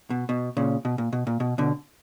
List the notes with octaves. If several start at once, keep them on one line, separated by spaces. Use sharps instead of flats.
B2
B2
A#2 C#3
B2
A#2
B2
A#2
B2
B2 D3